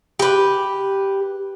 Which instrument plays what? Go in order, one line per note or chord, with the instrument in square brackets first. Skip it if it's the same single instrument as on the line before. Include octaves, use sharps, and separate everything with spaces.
[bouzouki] G4 B4